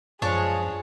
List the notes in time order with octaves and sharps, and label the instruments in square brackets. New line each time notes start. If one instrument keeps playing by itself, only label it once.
[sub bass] F#2 [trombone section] F3 G#3 [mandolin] D4 C#5 [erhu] G#4